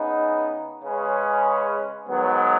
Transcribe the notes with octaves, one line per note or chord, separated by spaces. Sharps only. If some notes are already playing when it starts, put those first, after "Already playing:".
Already playing: C#3 B3 D#4
C#3 G#3 C#4 G#4 B4
G#2 D#3 F#3 B3